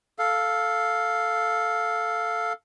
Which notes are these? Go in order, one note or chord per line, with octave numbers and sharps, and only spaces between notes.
A4 F5